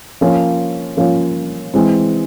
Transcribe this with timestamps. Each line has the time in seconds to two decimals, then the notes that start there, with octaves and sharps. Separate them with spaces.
0.21 F3 A#3 C#4 F4
0.97 F3 A#3 C#4 F4
1.74 E3 G#3 C4